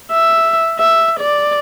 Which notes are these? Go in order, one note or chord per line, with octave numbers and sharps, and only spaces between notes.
E5
E5
D5